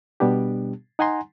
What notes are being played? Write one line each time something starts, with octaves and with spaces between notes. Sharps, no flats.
B2 G3 B3 D4 G4
D#4 F#5 G#5 A#5 C6